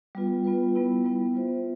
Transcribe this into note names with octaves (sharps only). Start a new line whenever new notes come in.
G3 B3 F4 B4
G3 B3 F4 B4
G3 B3 E4
G3 B3 E4
F4 C5 E5